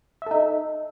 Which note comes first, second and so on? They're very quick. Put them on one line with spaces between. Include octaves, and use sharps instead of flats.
E5 A4 D#4